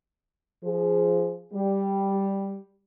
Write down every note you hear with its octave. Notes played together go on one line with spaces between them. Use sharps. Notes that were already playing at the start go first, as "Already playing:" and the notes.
F3 G#4
G3